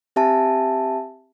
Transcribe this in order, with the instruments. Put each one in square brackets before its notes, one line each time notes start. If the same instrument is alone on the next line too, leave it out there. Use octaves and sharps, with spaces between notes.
[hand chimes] C4 G4 E5 G#5 A5